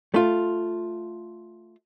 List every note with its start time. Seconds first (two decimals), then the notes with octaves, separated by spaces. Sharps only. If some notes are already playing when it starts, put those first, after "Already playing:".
0.14 A3 F4